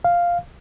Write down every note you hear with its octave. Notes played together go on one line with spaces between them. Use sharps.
F5